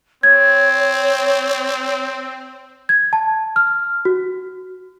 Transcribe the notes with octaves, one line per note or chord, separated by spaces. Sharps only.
C4 C#5 G#6
G#6
A5
F6
F#4